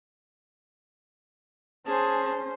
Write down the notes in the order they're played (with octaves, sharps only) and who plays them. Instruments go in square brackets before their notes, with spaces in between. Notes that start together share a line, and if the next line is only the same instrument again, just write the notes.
[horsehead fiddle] C#4 C5 [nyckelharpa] G#4 A5